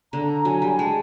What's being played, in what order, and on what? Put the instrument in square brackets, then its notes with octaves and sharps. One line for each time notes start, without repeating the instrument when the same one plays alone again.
[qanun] D3 [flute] A#5
[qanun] F#3 [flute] G#5
[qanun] G3
[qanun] G#3 [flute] A5